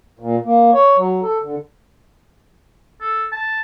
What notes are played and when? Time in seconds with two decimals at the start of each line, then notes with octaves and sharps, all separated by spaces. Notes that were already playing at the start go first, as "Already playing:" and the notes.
0.20 A#2
0.45 A#3
0.74 C#5
0.97 F#3
1.23 A4
1.42 D3
3.01 A4
3.32 A5